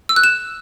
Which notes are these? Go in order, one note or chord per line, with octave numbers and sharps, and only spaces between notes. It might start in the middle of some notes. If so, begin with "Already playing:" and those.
E6
F#6
E7